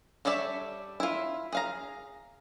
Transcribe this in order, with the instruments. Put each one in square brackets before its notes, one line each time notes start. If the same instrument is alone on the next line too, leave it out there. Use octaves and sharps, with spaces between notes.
[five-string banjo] G3 A4 C#5 D5 E5
E4 F4
G#4 F5 A#5